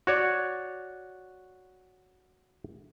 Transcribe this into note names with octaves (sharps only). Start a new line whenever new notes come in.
F#4 C#5 D5